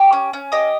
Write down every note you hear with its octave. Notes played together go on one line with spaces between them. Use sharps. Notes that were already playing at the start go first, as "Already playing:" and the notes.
Already playing: G4 C#5
C#4
C#4
G4 D#5 D#6